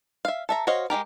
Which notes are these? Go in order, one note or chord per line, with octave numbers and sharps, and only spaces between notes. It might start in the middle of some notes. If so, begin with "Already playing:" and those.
E5 F5
A4 E5 A#5
F#4 C5 C#5 D#5 F5
G#3 E4 G4 A#4